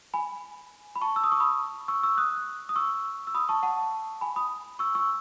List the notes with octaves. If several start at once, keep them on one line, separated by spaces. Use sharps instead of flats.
G#5 B5
B5
A5 C#6
E6
D#6
C#6
B5 D#6
C#6 E6
C#6 E6
D#6 F#6
D#6
C#6 E6
E6
B5 D#6
A5 C#6
F#5 A5
G#5 B5
B5 D#6
C#6 E6
C#6 E6